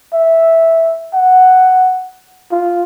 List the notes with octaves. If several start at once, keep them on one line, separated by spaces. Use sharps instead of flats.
E5
F#5
F4